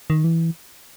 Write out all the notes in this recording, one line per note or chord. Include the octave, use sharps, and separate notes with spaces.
D#3
E3